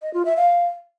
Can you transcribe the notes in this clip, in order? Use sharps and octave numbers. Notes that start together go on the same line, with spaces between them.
D#5
F4
E5
F5